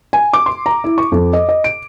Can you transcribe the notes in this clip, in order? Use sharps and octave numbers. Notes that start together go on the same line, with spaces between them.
G#5
D6
C6
A#5
E4
C#6
F2
D#5
D#5
D7